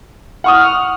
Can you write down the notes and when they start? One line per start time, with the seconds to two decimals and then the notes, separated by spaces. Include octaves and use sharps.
0.44 F#5 C#6 D#6 F6